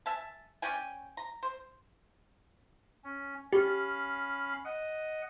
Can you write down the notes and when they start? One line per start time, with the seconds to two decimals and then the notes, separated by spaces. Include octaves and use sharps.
0.06 E5 G#5 A5
0.62 C#4 D5 G5 G#5
1.17 A#5
1.43 C5
3.04 C#4
3.53 C#4 G4 F5 B5
4.65 D#5 F#5